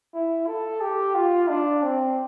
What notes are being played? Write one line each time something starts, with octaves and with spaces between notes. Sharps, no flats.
E4
A4
G4
F4
D4
C4